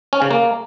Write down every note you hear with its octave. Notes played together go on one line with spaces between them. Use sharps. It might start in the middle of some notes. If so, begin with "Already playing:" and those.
C#4
C#3
A#3